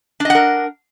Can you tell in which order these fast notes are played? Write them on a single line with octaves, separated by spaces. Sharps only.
D4 D#5 F#5 A#4